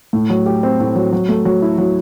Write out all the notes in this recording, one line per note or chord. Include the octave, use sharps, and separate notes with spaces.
A2
F#3
G4
C4
A2
F#3
F#3
A3
F#3
E4
F#3